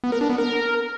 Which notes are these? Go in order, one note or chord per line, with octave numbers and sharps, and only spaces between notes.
B3
A#4
D4
B3
A#4